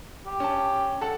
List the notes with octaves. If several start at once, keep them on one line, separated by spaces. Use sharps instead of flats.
G4
C#4 A5
A4 F#5 A5